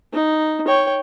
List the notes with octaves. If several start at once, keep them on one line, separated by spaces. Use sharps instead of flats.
D#4
C#5 G5